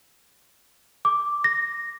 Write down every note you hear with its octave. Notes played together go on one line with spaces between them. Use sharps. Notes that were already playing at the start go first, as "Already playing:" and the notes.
D6
A#6